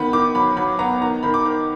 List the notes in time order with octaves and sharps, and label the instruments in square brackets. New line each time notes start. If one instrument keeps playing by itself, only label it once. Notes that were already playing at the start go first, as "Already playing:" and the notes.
Already playing: [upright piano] D#3 B3 B5
D#3 D6
F#3 B5
F#3 B5
B3 A#5
D#3 A#5
D#3 B5
D6
D#3